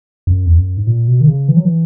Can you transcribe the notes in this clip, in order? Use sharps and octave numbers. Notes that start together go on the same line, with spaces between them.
F#2
E2
F#2
G#2
A#2
B2
D#3
C#3
E3
F#3
E3